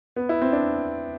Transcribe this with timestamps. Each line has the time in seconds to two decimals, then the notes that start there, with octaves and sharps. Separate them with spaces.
0.16 B3
0.29 E4
0.42 C4
0.53 D4